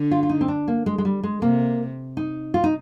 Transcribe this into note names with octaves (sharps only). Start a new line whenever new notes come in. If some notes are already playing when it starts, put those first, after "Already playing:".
Already playing: D3
F4
F4
D#4
C4
D4
A#3
G#3
G#3
G3
G#3
C3 A#3
D#4
F4
D#4